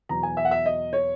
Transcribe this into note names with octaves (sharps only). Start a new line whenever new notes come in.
E2 B2 F#3 A#5
G#5
E5
F#5
E5
D#5
C#5